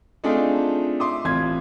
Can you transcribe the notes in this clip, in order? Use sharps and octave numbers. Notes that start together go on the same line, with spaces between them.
A3 C4 D4 D#4 F4 G#4
E5 C6 D6 D#6
A1 C4 F4 G#6